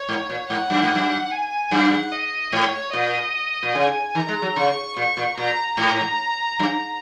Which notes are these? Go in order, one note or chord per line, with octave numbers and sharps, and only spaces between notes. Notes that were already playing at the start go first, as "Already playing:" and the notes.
Already playing: C#5
G#2
A#2
G#2 F#5
F#2
G#2
F#2
G#5
F#2 F#5
D#5
G#2 C#5
A#2 D#5
A#2
C#3 G#5
D#3 A#5
G#3
F#3
C#3 C#6
A#2 C#6
A#2
A#2 A#5
G#2 A#5
F#2